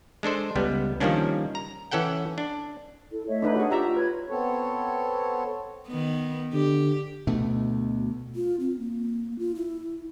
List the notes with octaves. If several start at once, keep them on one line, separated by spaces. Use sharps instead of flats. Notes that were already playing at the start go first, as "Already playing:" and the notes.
G#3 D4 A4 C5
C#2 G3 B3
D#3 F3 G3 A#3 C#4 D4
A#5
E3 C#4 A4 F#5 G5
D4
E4 A4
A3 C#5 D#5 E5
D4 D#4 B4
D4 D#4 F#4 G#4 C#5
F4 G4 E5 A#5
B4 C#5 G#6
B3 C4 A4 C#5
D#3 B3
D3 G4
D2 B2 A3
F4
C4
A#3
F4
E4